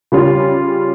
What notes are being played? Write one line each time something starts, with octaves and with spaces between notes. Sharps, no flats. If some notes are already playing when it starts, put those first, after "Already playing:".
C#3 G3 C#4 F4